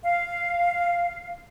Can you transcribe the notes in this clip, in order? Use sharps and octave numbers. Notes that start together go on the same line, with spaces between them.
F5